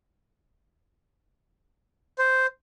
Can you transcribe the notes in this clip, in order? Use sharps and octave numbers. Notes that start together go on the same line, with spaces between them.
C5